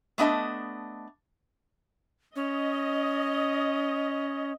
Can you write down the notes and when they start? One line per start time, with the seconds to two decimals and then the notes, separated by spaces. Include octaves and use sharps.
0.18 A3 B3 D4 D#5 A5
2.36 C#4 D#5